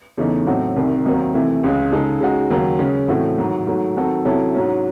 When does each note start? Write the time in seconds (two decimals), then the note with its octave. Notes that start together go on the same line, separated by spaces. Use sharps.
0.17 E2 C#3 E3 A3 D#4
0.46 A2 F#3 C4 F#4 A4
0.76 C2 C3 D#3
1.05 D#2 D#3 F#3 C4 D#4
1.34 C3 E3 A3
1.64 C#2 C#3 G#3
1.92 C#3 G#3 D#4 A4
2.21 C#3 G#3 D#4 F#4
2.50 D#2 C#3 F#3
2.79 C#3 G#3 C#4
3.08 A2 E3 A3 C4 F#4
3.38 G#2 D#3 F#3
3.67 G#2 F#3 A3
3.96 D#3 F#3 C4 F#4 A4
4.25 C3 F#3 C#4 E4 A4
4.54 G#2 F#3 C#4